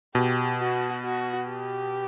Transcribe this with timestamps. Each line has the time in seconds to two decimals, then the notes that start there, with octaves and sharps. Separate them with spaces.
0.15 B2 G4
0.60 F#4
1.04 F#4
1.49 G4